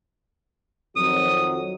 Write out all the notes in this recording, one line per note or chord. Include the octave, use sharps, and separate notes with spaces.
F2 D#3 F#3 D#6